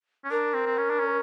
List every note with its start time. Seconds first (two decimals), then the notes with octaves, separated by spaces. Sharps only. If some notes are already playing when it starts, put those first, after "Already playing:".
0.25 C#4
0.31 D4 A#4
0.54 C4
0.66 C4
0.77 C#4
0.90 D4
1.00 C#4